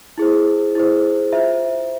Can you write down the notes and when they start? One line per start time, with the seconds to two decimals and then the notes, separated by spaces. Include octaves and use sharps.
0.18 E4 G#4 C5
0.75 E4 G#4 C5
1.32 F4 C5 E5